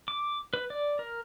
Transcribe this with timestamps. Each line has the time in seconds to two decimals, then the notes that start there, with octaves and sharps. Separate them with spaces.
0.08 D6
0.54 B4
0.70 D5
0.99 A#4